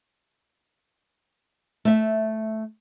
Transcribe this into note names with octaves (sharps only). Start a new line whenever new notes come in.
A3 E5